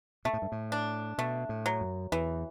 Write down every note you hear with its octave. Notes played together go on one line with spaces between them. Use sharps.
B2 A3
A2
G2
A2
D4
B2 A3
A2
F#3
F#2
E2 E3